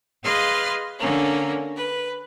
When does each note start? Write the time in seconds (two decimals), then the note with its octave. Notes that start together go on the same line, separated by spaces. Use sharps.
0.23 G#4 B4 D#5 F5 C6 F6
0.98 D3 A#3 C#4
1.77 B4